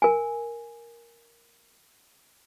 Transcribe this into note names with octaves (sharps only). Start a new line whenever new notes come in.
A#4 G#5